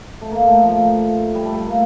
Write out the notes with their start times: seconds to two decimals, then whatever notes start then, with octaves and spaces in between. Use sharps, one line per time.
0.21 A3
0.32 A#3
0.47 A3
0.63 F3
1.35 G3
1.45 A3
1.56 A3
1.66 A#3